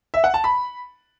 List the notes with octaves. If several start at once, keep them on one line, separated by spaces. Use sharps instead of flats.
E5
F#5
A5
B5